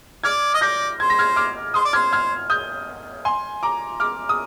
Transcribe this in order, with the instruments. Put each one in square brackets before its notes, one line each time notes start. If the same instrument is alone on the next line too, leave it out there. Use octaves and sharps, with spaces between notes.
[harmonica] D5 [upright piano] F6 G#6
[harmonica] D#5
[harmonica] D5 [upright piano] G6 A#6
[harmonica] C5 [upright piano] G#6
[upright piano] A#6
F6 G#6
D6 F6
[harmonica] C5 [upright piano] C6 D#6
[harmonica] D5
[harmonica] C5 [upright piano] F6 G#6
[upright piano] F6 G#6
D#6 G6
G#5 C6
A#5 D6
D6 F6
D#6